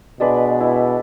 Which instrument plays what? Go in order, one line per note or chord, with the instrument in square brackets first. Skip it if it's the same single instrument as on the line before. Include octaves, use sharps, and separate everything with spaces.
[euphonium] B2 [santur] G#3 D4 B4
[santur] E4